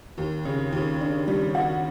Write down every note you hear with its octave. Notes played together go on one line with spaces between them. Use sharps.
D#2
C#3
D#2
D4
G3
F#4